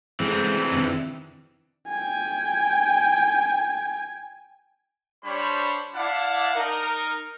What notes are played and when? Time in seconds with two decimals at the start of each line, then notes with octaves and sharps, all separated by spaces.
0.20 E3 G#3 A3 C4
0.71 C3 D#3 D4
1.90 G5 G#5
5.24 G3 D4 C5 C#5 B5
5.95 E4 D5 F5 F#5 A5
6.54 D#4 A#4